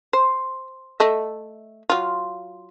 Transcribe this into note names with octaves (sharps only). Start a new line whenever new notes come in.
C5
A3 D#5 E5
F#3 F4